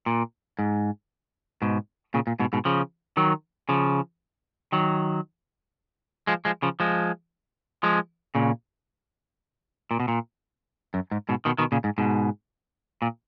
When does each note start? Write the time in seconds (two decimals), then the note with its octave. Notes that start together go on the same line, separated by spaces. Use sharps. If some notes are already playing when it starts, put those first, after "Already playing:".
0.06 A#2
0.59 G#2
1.62 G#2 B2
2.14 A#2 C#3
2.27 A#2
2.39 G#2 B2
2.53 G#2 B2
2.65 C#3 F3
3.17 D#3 F#3
3.69 C#3 F3
4.72 D#3 F#3
6.27 F3 G#3
6.45 F3 G#3
6.62 C#3 F3
6.80 F3 G#3
7.83 F3 G#3
8.35 A#2 C#3
9.91 A#2
10.00 B2
10.08 A#2
10.94 F#2
11.11 G#2
11.29 G#2 B2
11.45 B2 D#3
11.58 B2 D#3
11.72 A#2 C#3
11.84 G#2
11.98 G#2 B2
13.02 A#2